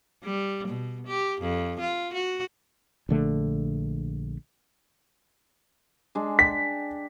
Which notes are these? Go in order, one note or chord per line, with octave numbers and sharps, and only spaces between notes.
G3
B2
G4
F2
F4
F#4
A#1 D3 A3
G#3 D4
G5 B6